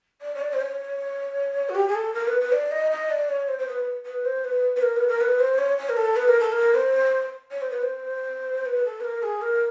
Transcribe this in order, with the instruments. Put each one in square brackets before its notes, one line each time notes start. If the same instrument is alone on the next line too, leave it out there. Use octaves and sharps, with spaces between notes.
[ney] D5
C#5
D5
C5
C#5
F#4
G4
G#4
A4
A#4
B4
B4
D5
D#5
D#5
D5
C#5
C5
C5
B4
B4
C5
B4
B4
A#4
B4
A#4
B4
C5
C#5
C#5
A#4
A4
B4
A#4
A4
A#4
C5
C#5
C5
B4
C5
B4
A4
B4
A#4
G#4
A#4